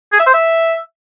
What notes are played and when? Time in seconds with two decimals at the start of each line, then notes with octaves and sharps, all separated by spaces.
0.12 G#4
0.20 E5
0.27 C5
0.34 E5